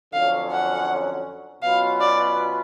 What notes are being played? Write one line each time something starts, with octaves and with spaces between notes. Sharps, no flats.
F2 D3 F#3 C#4 F5
F#5
B2 F#3 C#4 F4 B4 F5
D5